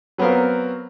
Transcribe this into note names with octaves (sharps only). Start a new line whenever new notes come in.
F#3 B3 C4 A#4 F5